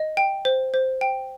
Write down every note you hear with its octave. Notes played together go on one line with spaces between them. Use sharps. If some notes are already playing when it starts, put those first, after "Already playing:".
Already playing: D#5
G5
C5
C5
G5